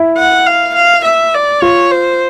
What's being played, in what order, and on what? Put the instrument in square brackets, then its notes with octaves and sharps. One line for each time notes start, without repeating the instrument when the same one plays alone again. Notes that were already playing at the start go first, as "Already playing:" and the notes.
Already playing: [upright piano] E4
[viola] F#5
F5
F5
E5
D5
[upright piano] F4 [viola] C#5
[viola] C5